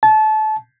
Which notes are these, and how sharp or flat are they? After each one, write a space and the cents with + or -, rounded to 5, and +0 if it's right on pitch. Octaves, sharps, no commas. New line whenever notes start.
A5 -25